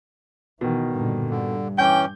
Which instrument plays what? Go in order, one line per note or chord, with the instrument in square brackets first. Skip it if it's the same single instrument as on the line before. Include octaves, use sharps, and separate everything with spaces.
[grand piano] B2 D#3 [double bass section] E3
[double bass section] G2 A#2 D3
[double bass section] G2 [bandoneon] D3
[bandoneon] E3 C#4 [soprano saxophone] G5 [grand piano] D6 G6